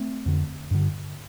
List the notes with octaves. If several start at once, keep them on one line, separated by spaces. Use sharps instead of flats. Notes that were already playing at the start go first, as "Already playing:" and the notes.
Already playing: A3 C4
F2 D3
G2 D3